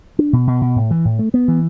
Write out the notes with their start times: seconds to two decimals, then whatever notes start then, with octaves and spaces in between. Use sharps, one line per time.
0.19 D4
0.33 B2
0.47 B2
0.61 B2
0.76 A2
0.91 E3
1.05 A2
1.19 A3
1.34 B3
1.48 E3